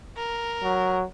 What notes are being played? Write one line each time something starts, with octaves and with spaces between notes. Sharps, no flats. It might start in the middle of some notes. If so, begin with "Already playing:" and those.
A#4
F#3